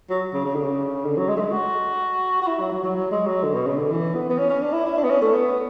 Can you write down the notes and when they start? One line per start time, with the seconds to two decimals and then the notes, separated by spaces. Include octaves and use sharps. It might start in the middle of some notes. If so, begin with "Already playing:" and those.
0.10 F#3
0.34 C#3
0.45 C#3
0.55 D3
0.64 C#3
1.05 D3
1.17 F#3
1.28 G#3
1.37 A3
1.41 G#3
1.52 F#4
2.42 F#4
2.47 E4
2.60 F#3
2.72 F#3
2.83 F#3
2.96 F#3
3.11 G#3
3.26 F#3
3.43 D3
3.55 B2
3.67 C#3
3.78 D3
3.91 E3
4.15 B3
4.29 B3
4.38 C#4
4.50 C#4
4.62 D4
4.73 E4
4.86 E4
4.98 D4
5.04 B3
5.10 C#4
5.22 A3
5.33 B3